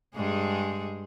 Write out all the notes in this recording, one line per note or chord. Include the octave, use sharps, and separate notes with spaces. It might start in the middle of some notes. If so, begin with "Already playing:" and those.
G2 G#3 G#4